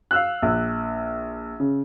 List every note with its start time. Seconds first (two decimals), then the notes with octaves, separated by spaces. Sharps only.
0.11 F5 E6 F#6
0.42 A#1
1.60 C#3